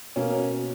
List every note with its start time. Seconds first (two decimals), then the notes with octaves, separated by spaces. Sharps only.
0.16 B2 A#3 C#4